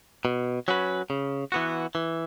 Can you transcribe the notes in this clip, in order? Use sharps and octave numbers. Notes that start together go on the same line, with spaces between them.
B2
F#3 C#4 F#4 B4
C#3
E3 B3 F#4
E3